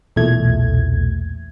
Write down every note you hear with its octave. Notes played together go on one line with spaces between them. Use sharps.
B1 E2 A#2 A3 G#6